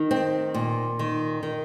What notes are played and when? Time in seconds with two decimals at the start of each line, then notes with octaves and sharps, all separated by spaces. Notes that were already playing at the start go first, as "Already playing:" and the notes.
Already playing: D#3 D#4
0.11 C4
0.54 A#2
0.99 D#3
1.43 D#3